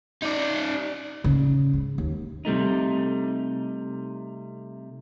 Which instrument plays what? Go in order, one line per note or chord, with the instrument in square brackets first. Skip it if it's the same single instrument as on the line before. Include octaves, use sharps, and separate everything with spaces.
[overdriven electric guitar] D#4 D5
[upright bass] C#3
G#2
D#2
[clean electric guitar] C3 G3 A3 D#4